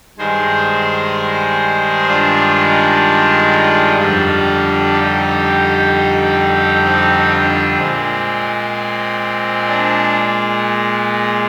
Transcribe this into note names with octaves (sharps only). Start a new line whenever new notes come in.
G2 D#3 G#3 G#4 C5
D4 F4
F2 D3 G3 D4 F4
D#4 G4
C4 D#4
D4 F4
A#2 G#3 C4
D4